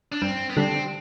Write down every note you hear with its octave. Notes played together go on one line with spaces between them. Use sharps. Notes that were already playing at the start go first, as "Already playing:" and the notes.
D4
G2 C4
B3
D3 G3 C4 D4